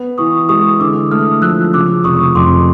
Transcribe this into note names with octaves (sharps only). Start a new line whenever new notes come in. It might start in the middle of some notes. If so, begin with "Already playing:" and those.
Already playing: B3
E3 C#6 D#6
G#3 C#6 D#6
D3 D6 E6
A3 D#6 F6
F3 E6 F#6
C#3 D6 E6
F1 C#6 D#6
F2 C6 D6